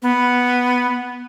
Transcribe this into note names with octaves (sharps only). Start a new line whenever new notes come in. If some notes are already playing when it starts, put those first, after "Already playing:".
B3